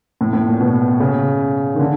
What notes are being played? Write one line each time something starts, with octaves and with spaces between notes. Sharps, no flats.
A2
A2
A#2
B2
C#3
D#3
D3